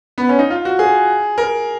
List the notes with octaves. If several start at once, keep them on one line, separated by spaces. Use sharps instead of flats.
B3
C#4
D#4
F4
F#4
G#4
A#4